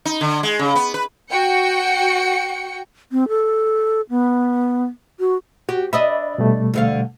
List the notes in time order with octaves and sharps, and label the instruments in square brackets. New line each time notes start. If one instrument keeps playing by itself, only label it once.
[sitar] D#4
D3
G#3
C#3
B3
B4
[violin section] F#4 G5 C#7
[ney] C4
A4
B3
F#4
[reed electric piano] F#4 [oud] G4
[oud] D4 D#5 E5 [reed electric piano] B5
[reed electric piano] B2 G3 A3
[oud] D2 D3 F5